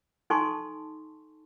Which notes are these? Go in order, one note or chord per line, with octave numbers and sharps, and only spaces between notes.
D#4 A4 G#5 A5 C6 C#6